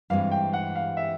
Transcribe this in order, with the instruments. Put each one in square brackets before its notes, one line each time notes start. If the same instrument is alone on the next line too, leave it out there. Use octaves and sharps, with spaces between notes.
[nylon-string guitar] G2 E3 G#3 C4 [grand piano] F5
[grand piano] G5
F#5
F5
E5